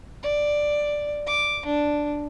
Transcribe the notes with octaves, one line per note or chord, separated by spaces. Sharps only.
D5
D6
D4